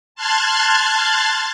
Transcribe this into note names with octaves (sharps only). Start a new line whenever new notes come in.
A5 C6 F6 F#6 G#6 A6